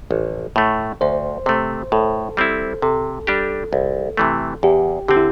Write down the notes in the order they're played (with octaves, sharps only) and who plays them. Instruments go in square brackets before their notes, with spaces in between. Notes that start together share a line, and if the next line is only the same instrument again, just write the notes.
[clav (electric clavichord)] A1
A2 A3
[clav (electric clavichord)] D2 [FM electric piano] C5
[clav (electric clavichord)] C3 A3 [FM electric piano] C5
[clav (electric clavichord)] A2 [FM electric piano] A4
[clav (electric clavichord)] G3 C4 E4
[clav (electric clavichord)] C3 [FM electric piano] A4
[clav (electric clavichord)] G3 D4 G4
C2
C3 E3 A3
[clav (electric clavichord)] E2 [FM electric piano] G4
[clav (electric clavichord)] D3 C4 [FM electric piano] G4
[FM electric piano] E4